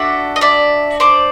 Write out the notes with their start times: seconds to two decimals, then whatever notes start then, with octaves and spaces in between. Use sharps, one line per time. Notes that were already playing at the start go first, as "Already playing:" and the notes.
Already playing: D4 F#4 A4 E5 F#5
0.36 D#5
0.41 D5 E5
1.00 C5 D5